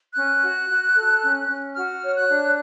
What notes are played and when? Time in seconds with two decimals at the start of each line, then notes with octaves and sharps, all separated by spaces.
0.16 C#4 F#6
0.43 F#4
0.69 F#4
0.96 A4
1.22 C#4
1.48 C#4
1.75 F#4 F6
2.02 C#5
2.16 F#6
2.29 D4